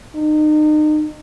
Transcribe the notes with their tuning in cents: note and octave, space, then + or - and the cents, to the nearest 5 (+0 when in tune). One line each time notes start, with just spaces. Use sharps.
D#4 -35